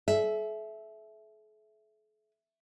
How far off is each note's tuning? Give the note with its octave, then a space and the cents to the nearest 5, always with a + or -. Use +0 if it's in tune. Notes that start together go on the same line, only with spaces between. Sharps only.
A4 -45 E5 +0